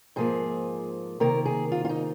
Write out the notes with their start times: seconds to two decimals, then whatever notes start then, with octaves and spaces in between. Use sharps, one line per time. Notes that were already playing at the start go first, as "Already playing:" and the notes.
0.16 G#2 F3 A#3 G#4
1.20 C3 D#3 A#3 A#4
1.45 G#4
1.72 F4
1.85 F4
1.89 D#4